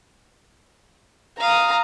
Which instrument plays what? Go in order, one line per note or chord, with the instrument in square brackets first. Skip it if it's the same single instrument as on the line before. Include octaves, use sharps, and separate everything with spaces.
[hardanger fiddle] F5 D#6 [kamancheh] A#5